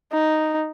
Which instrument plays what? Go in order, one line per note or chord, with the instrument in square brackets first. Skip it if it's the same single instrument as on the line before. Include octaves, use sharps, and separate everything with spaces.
[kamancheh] D#4